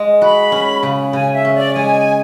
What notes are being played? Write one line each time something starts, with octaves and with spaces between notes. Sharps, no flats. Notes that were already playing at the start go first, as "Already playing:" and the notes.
Already playing: G#3
F#4 B5
C#4
C#3
C#3 G#5
E5
C#4
D5
G#3 G#5